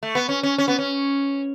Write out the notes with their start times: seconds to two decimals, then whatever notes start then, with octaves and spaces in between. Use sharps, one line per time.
0.03 A3
0.15 B3
0.29 C#4
0.43 C#4
0.58 C#4
0.68 B3
0.79 C#4